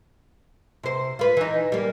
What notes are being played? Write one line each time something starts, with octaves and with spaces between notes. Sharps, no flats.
C3 C5
F4 B4
E3 D#4
G3 A#3